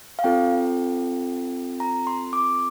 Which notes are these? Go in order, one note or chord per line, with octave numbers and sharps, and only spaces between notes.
F5
C4 F4 A4 G5
A#5
C6
D6